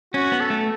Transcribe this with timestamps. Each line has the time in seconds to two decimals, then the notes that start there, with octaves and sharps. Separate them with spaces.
0.14 C#4 F#4
0.32 B3
0.40 A4
0.50 A3